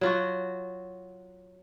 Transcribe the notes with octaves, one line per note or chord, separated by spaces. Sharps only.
F#3 F4 F#4